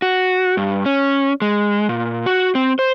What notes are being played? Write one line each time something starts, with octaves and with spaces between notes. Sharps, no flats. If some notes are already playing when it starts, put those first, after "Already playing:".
F#4
G2
C#4
G#3
A#2
F#4
C4
C5